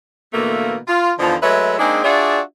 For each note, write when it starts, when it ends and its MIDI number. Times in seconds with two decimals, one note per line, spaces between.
0.33 0.77 47
0.33 0.77 50
0.33 0.77 52
0.33 0.77 57
0.33 0.77 58
0.88 1.12 65
1.19 1.36 40
1.19 1.36 50
1.19 1.36 51
1.19 1.36 53
1.42 1.75 54
1.42 1.75 56
1.42 1.75 57
1.42 1.75 71
1.42 1.75 73
1.42 1.75 76
1.79 2.01 56
1.79 2.01 58
1.79 2.01 60
1.79 2.01 62
1.79 2.01 63
1.79 2.01 68
2.04 2.41 62
2.04 2.41 65
2.04 2.41 66
2.04 2.41 68
2.04 2.41 74
2.04 2.41 76